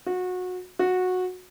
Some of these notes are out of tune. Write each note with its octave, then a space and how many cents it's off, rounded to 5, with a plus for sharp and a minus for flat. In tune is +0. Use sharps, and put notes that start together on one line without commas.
F#4 -25
F#4 -15